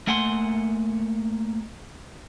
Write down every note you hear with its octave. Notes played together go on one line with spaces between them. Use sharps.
A3 A#3 F#5 G#5 C6